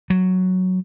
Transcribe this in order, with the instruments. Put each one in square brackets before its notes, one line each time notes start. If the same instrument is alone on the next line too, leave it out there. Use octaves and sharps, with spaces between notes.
[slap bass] F#3